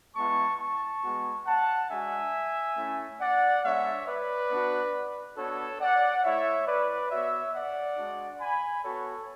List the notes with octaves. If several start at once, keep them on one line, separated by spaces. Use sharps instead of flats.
G#3 B3 E4 A5 C#6
A5 C#6
G#3 B3 F#4
F#5 A5
G#3 D4 F#4 E5 G#5
A3 C#4 E4
D5 F#5
G#3 B3 D4 C#5 E5
B4 D5
B3 D4 F#4
B3 D4 F#4 A4 C#5
D5 F#5
A3 E4 C#5 E5
B4 D5
B3 F#4 C#5 E5
D5 F#5
G#3 D4 F#4
G#5 B5
B3 F#4 A4 C#5